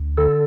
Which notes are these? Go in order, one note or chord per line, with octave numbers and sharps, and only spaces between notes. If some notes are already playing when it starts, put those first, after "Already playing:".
Already playing: D2
D3 A4